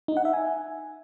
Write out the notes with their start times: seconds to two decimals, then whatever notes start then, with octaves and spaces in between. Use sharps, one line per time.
0.08 D#4
0.17 F#5
0.25 E5
0.33 G#5